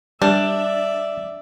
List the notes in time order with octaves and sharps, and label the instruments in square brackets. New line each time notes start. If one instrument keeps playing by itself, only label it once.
[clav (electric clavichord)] G3 [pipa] D4 [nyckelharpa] D5 E5